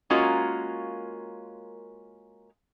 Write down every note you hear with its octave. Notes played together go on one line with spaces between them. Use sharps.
G#3 A#3 C#4 F4 F#4 A#4